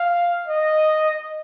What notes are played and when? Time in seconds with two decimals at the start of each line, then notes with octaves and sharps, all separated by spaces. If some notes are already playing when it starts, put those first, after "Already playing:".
Already playing: F5
0.47 D#5